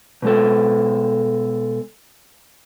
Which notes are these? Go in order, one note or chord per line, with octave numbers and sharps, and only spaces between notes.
B2 G#3 A4